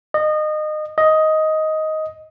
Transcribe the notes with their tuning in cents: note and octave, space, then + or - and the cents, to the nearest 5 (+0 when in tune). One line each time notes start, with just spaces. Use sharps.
D#5 -25
D#5 +10